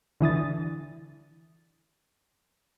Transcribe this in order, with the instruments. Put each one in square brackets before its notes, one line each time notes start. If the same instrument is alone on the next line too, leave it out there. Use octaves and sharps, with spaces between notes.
[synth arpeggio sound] D3 E3 D#6 A6